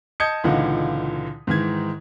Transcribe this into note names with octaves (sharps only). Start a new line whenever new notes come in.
D#5 A5 D#6 G6 G#6 C#7
C#2 A#2 D3 E3 D#4 F#5
G#2 D#3 E3 G#6